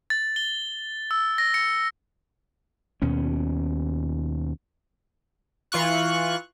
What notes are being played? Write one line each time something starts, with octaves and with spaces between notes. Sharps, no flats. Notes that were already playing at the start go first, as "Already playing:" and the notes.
A6
G7
E6
A#6
C#7
D#2 B2 C#4
E3 F4 C#6 F#6